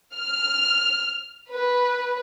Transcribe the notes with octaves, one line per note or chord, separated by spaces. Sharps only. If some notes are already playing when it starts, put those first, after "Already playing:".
F6
B4